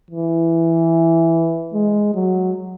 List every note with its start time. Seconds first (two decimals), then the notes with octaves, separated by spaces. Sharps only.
0.11 E3
1.74 G#3
2.15 F#3